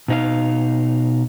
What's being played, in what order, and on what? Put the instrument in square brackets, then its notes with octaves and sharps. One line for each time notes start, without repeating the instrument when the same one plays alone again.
[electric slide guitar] B2 D#4 F5